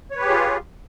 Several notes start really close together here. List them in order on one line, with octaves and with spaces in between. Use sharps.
C#5 B4 G4 G#4 F4